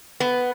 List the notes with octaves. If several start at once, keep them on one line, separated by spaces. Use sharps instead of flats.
B3